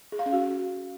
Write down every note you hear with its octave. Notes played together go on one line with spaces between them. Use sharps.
G#4
F5
C#4
F#4